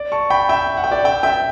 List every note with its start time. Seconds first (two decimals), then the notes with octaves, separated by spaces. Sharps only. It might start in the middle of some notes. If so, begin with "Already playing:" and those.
Already playing: D5
0.12 A5 C#6
0.30 G5 B5
0.49 E5 G5
0.77 F#5
0.84 G5
0.91 D5 F#5
1.04 E5 G5
1.23 E5 G5